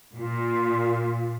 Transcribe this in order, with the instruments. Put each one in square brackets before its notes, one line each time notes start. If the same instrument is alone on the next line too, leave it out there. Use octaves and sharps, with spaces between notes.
[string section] A#2 [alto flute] F4